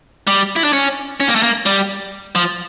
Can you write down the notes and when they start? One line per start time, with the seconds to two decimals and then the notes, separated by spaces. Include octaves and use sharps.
0.27 G3
0.56 E4
0.64 D4
0.73 C#4
1.20 C#4
1.28 A#3
1.36 A3
1.43 A#3
1.66 G3
2.35 F3